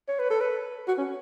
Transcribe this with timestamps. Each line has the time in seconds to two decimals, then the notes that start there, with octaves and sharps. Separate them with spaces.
0.08 C#5
0.19 B4
0.30 A4
0.41 B4
0.88 F#4
0.98 C#4